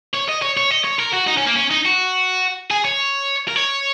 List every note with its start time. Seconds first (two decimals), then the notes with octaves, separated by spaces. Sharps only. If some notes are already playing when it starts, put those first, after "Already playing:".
0.14 C#5
0.28 D#5
0.42 C#5
0.57 C#5
0.71 D#5
0.85 C#5
1.00 A#4
1.14 F#4
1.28 D#4
1.38 C#4
1.47 A#3
1.56 C#4
1.71 D#4
1.86 F#4
2.71 G#4
2.85 C#5
3.48 A#4
3.56 C#5